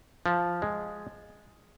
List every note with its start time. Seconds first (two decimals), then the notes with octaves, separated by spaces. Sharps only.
0.26 F3
0.62 G#3